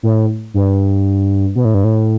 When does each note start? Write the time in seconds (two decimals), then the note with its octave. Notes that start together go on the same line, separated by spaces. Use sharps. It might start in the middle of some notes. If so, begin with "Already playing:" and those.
0.03 A2
0.54 G2
1.55 B2
1.65 A2
1.74 G2
1.84 A2